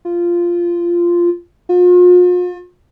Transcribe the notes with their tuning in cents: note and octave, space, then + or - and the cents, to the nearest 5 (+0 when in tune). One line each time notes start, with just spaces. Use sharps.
F4 -10
F4 +40